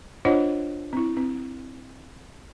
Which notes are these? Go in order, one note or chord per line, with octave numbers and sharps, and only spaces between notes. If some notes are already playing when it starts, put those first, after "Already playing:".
D4 F4 C5 C#5 D#5 F#5
C4 E4
C4